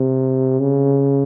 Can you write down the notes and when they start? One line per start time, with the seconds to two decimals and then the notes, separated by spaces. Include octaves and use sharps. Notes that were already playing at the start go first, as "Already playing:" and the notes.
Already playing: C3
0.60 C#3